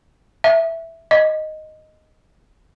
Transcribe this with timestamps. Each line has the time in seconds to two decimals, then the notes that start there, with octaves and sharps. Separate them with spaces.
0.44 E5
1.11 D#5